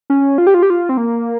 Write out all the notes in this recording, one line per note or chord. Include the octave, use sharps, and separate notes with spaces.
C#4
F4
G4
F4
G4
F4
C4
A#3